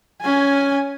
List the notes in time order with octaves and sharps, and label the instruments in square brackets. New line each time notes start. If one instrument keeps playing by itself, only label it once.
[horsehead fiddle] C#4 G#5